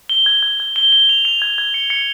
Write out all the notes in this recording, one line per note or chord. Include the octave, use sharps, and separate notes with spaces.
G7
G#6
G#6
G#6
G7
G7
F7
F7
G#6
G#6
C#7
C#7